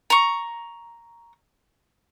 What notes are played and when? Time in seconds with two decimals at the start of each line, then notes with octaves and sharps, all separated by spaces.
0.10 A#5 C#6